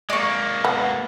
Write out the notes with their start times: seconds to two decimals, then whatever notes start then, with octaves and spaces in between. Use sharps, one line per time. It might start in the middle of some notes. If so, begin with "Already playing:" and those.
0.10 G#3 A#3 D5 C#6
0.65 B3